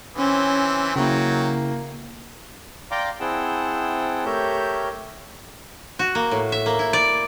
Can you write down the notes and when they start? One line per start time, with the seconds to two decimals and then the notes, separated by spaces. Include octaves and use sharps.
0.17 E3 C4 C#4
0.96 C#3 F#3 A#3 E4 G5
2.91 D5 F5 G5 A#5 C6 D6
3.20 C4 E4 G#4 F#5 G5 A5
4.25 A3 G4 A#4 C#5 E5 G6
5.99 F#4
6.15 A#3
6.31 A2
6.52 E5
6.66 A#3
6.79 E4
6.93 D5